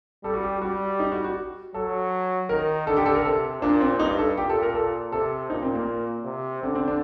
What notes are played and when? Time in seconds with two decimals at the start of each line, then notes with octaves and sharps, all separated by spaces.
0.24 G3 A4
0.34 F#4
0.43 G4
0.62 G3 F#4
1.00 D#4
1.12 F#4
1.24 F#4
1.74 F#3 A4
2.49 D#3 A#4
2.87 D3 A4
2.97 G4
3.06 A4
3.15 A#4
3.25 C3 A4
3.62 A#2 D4
3.81 C4
3.99 G2 D#4
4.18 A4
4.37 A#2 G4
4.50 A4
4.62 A#4
4.75 A4
5.12 C3 A4
5.50 A#2 D#4
5.62 C4
5.75 A#3
6.25 C3
6.62 D3 C4
6.75 C4
6.88 D4